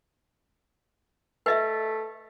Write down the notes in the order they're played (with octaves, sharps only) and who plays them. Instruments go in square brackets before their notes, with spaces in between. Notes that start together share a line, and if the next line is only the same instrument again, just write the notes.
[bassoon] A3 [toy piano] B4 D#5 E5